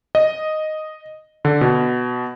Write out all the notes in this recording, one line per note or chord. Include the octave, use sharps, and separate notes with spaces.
D#5
D3
B2